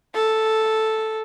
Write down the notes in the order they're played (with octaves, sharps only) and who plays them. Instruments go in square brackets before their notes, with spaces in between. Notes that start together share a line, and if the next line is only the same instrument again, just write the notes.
[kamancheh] A4